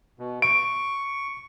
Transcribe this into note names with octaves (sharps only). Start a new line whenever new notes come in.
B2
C#6 D7